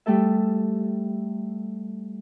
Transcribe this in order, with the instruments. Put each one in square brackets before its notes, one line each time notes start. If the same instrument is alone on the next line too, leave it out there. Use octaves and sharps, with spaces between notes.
[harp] G3 A3 A4 E5